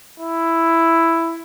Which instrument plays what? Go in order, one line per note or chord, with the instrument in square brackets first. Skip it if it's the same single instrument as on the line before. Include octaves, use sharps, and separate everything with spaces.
[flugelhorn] E4